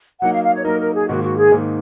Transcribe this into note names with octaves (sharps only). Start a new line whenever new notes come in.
F#3 A#3 D#4 F#5
F5
F5
C#5
F#3 A#3 D#4 A#4
A#4
G#4
G#2 D#3 A#3 F#4
F#4
G#4
G#2 D#3 A#3